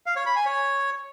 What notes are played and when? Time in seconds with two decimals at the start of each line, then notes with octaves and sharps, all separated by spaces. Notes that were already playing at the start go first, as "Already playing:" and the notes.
0.06 F5
0.16 C#5
0.26 B5
0.36 G#5
0.46 C#5